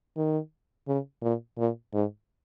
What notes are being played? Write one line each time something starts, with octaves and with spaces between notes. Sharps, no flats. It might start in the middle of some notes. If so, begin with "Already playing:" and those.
D#3
C#3
A#2
A#2
G#2